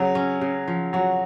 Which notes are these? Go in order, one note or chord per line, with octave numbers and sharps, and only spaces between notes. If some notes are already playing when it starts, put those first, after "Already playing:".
Already playing: C#3 F#3
C#4
C#3
F3
F#3 F#4